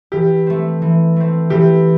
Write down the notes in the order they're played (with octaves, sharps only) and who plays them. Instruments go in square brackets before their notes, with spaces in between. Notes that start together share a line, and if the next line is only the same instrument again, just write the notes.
[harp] E3 [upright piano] G4
[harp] A3 C4
E3
A3 C4
[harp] E3 [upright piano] G4